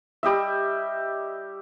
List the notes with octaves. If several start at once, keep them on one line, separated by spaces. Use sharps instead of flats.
G3 G4 D#5 E5